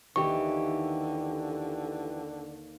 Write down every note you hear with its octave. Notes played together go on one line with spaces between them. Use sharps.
D#2 D3 E3 G4 C#6